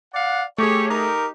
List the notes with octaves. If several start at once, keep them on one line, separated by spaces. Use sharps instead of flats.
D5 F5 F#5
A3 G4 G#4 C#5
D#4 G4 A#4